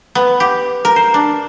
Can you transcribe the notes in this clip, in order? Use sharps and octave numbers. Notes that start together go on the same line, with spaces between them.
B3
G4
A#4
C5
D4